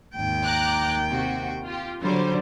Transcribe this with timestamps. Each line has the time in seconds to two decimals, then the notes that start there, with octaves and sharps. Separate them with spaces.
0.15 G#1 D#2 G5
0.44 A#5 D6 F#6
1.09 C3 F#4
1.66 F4 G4
2.02 D3 F#3 G3 C5